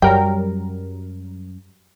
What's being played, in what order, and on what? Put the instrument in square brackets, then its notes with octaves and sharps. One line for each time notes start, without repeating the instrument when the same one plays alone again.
[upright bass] F#2 [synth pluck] F#3 G3 A#4 [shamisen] G5